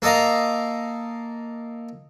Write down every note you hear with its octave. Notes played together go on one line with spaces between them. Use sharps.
A#3 A4 D#5 F5 A#5